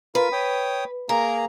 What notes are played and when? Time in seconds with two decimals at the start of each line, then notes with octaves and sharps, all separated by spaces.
0.15 F4 A#4 B4
0.32 C#5 G5 D#6
1.09 A#3 G#4 A#4 A#5